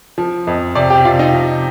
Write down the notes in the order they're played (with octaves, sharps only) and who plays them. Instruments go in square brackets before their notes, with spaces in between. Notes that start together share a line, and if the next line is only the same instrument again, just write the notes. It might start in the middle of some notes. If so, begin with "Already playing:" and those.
[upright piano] F3
F2
C3 D5
G4
C3 F4
D#4
F3